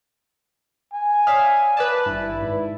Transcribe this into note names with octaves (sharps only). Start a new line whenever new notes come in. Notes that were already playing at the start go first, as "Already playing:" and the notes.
G#5
C#5 D5 E5 F5 D#6
B4 D5 A5
G#1 G2 E4
G#2